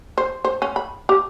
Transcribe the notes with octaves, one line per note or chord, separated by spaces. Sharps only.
C5
C5
C#4
B5
G4